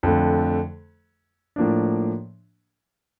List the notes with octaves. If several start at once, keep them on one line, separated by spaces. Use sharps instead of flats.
F2 D3 A3
A2 F3 A#3 D4